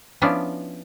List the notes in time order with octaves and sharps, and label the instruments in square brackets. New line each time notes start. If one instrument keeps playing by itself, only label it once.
[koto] F3 B3 C#4 D4 E4